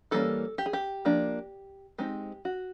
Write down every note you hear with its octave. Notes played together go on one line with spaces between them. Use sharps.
E3 G3 A#3 C#4 A4
G4
G#4
G4
F3 A#3 D4
G#3 C4 D#4 G4
F#4